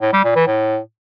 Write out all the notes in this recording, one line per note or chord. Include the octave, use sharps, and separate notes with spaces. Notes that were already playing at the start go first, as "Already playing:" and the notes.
A2
G3
A#2
E3
A2